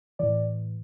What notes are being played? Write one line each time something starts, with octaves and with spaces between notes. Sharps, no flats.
A2 E3 D5